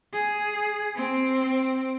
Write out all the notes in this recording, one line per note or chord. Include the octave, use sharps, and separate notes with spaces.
G#4
C4